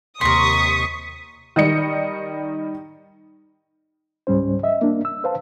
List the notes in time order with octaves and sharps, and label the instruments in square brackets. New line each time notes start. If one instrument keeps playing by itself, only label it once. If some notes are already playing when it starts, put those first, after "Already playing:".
[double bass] D#2 C3 [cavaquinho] A#4 C6 [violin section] C#6 D#6 [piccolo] B6
[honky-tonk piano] D#3 G3 D#5 C#7
[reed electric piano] C#2 G#2 G3 C#4 C5
D#5 E5
A#3 D4
E6
B4 C5 F5 A5